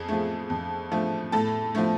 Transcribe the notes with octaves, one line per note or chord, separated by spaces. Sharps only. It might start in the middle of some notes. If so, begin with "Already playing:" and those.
Already playing: F2 G#4
F3 A3
F2
F3 A3
A2 A4 A5
F3 A3